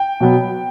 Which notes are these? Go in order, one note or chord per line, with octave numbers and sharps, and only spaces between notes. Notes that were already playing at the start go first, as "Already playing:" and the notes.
Already playing: G5
B2 F#3 B3